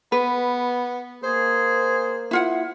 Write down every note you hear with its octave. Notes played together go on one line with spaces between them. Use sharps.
B3 B4
A#3 G#4 C5
E4 F4 F#5